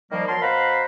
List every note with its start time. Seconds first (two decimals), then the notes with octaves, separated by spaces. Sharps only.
0.12 D#3 F3 G3 A#3
0.28 F#3 A#4 A5 C6
0.42 B2 C5 F5 F#5 A#5 B5